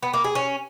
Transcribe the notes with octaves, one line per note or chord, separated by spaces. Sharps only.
B3
A#3
G#4
C#4